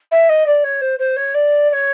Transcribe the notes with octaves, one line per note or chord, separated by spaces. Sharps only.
E5
D#5
D5
C#5
C5
C5
C#5
D5
D5
C#5